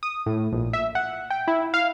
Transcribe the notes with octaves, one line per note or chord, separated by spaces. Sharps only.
D#6
A2
A#1
E5
F#5
G5
E4
F5